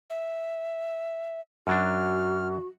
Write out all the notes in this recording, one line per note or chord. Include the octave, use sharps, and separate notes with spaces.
E5
F#2 F#3 D4 F#4 F6